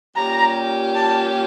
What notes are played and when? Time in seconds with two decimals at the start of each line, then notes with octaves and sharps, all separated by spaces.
0.16 A#2 G3 C#4 G4 A#5
0.95 A5